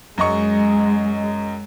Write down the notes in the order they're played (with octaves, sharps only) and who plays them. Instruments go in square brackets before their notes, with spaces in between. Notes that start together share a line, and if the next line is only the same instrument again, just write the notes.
[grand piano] F#2 D#5 C#6 [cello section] G#3